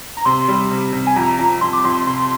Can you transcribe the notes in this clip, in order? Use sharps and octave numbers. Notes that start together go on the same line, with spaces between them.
A#5
C3 C6
G3
C3
C3
G#5
F2 A#5
F2
F2 C6
D6
F2 C6
C3 C6